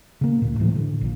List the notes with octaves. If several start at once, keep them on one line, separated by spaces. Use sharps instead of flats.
C#3 A#3
D2 A#2
A2 E3 F3
D3
A#1 A#2